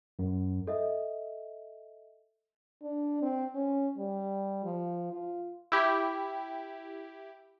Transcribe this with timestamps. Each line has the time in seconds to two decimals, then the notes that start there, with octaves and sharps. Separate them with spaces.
0.19 F#2
0.67 A4 D#5 E5
2.82 D4
3.22 C4
3.55 C#4
3.98 G3
4.64 F3
5.13 F4
5.72 E4 G4